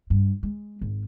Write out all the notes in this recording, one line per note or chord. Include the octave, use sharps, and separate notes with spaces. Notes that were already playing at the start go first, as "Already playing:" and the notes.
G2
G#3
G#1